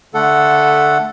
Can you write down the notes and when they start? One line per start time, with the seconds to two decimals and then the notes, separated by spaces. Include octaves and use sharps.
0.14 D3 A3 A4 F#5